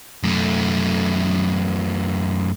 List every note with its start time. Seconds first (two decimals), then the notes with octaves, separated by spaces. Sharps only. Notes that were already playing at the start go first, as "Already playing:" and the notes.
0.23 F#2 A3